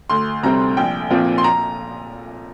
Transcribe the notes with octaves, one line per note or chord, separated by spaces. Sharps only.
D2 C6
C3 G3 C4 A#5
A#1 G5
A#2 F3 C4
C6
A#5